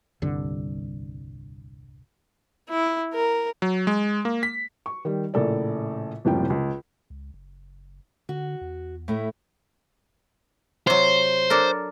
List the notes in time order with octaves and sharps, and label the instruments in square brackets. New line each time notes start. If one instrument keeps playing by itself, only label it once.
[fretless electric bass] D#1 C2 G2 D3
[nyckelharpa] E4
A#4
[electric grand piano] F#3
G#3
A#3
B6
[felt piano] C#6
D#3 G3
A#1 A2 C#3 A4 A#4 D5
F#1 A2 C3 F3 G3 G5
C#2
[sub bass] C#2
F#1
[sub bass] D3 [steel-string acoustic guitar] F#4
[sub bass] E2
[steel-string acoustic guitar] A2 A3 E4
[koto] C3 F#3 [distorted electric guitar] C5
[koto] D4 A4 A#4